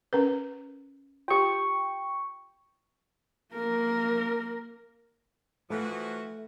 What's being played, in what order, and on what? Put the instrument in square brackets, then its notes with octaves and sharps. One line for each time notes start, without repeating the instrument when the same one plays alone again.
[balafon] C#4 A#4 B4
[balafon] F4 G4 [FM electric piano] G5 C#6
[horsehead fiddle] A#3 A#4
[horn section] E3 F3 F#4 [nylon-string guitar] A3